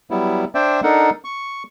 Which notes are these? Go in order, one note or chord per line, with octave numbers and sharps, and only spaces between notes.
F#3 G3 B3 E4
D4 C5 D5 E5 G5
D4 D#4 A4 A#4 F#5
C#6